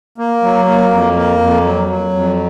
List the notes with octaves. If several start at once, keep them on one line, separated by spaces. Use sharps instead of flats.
A#3
F#3
A#3
F2
A#3
F2
F#3
F#3
F2